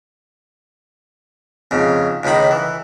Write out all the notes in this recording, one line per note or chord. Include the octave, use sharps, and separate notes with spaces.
F2 G#2 C#3
C#2 A2 D#3 D#4 B5
E3